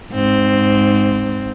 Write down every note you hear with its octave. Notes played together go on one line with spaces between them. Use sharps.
G#2 C4